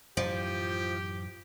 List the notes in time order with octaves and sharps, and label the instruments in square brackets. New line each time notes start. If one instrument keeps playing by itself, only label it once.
[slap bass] F#2 A2 E3 [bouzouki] F3 [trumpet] G4